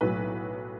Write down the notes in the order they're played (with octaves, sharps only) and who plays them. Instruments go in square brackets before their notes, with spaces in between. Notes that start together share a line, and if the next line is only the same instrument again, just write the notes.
[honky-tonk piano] B1 A2 F#3 B4